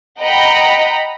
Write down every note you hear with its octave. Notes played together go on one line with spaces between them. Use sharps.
D#5 F#5 G5 A#5 B5